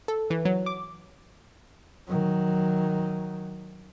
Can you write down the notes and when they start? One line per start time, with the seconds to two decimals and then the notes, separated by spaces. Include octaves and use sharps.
0.08 A4
0.30 E3
0.45 F#3
0.66 D6
2.08 D#3 F#3